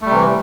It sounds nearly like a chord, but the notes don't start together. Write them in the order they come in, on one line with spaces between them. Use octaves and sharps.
A3 G3 C3 E3